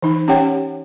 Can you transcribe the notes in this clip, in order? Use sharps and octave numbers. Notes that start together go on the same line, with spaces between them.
E3 D#4
C#4 G4 C#5 F#5 G5